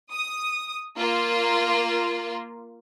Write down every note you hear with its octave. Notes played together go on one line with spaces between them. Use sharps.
D#6
A#3 F4